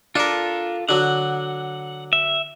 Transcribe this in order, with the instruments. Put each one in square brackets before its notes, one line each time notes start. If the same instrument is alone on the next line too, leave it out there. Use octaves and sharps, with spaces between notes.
[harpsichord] D4 A#4 [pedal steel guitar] F4 A4
[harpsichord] D3 F#3 [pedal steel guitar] F#5
[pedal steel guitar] E5